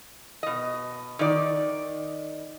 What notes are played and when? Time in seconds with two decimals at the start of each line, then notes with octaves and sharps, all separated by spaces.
0.43 B2 D#5
1.19 D#3 D#4 D5